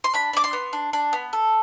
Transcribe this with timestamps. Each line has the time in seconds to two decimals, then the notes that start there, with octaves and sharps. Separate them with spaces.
0.04 C6
0.14 D4 B5
0.33 D4 D6
0.44 C6
0.53 B3
0.73 D4
0.93 D4
1.13 B3
1.33 A4